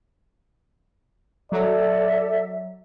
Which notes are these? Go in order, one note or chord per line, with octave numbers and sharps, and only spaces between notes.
F#3 A4 D5 E5